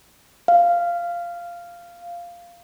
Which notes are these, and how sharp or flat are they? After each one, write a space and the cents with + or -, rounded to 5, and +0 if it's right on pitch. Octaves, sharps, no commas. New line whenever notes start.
F5 -10